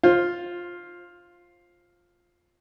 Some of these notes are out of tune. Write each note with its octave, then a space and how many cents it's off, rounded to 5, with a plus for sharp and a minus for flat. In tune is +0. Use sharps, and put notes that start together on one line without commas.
F4 +5 C5 +25